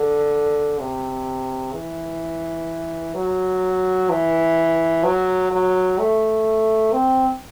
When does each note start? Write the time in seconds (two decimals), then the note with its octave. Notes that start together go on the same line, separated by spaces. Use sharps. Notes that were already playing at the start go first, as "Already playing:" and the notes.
Already playing: D3
0.80 C3
1.74 E3
3.15 F#3
4.10 E3
5.05 F#3
5.52 F#3
5.99 A3
6.93 C4